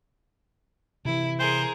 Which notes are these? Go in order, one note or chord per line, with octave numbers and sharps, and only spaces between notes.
C3 E3 E4
G#4 A#4 C5